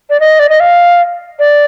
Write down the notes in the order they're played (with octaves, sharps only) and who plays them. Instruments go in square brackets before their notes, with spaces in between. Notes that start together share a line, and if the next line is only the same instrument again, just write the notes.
[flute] D5
D#5
D5
D#5
F5
D5